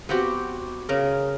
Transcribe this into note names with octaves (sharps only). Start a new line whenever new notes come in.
B3 C4 F#4 G4
C#3 A#4